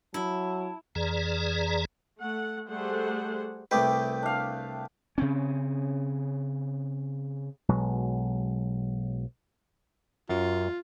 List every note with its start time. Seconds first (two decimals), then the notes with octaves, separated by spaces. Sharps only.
0.14 F#3 E4 A5
0.95 F2 E3 G#4 D5 A#5
2.19 A3 F#5
2.68 G3 A3 G#4 C5 F#5
3.71 C2 A3 B4 G5 D6
4.23 D4 F5
5.18 C#3 C4 C#4
7.69 B1 B2 F#3 G#3
10.29 F#2 F4